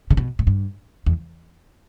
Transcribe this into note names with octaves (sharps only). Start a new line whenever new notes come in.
C#3
B2
A#2
G2
E2